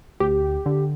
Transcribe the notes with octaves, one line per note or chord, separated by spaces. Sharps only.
D2 G4
D3